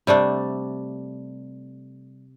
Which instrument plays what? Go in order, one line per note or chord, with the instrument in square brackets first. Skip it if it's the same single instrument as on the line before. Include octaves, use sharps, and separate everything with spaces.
[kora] C3 G3 A3 D4